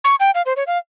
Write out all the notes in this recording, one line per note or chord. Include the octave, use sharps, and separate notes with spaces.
C#6
G5
F5
C5
C#5
F5